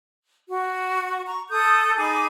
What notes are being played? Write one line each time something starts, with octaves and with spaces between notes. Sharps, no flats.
F#4
A#5 C#6
A4 D#6 G6
D#4 G#4 B5 D6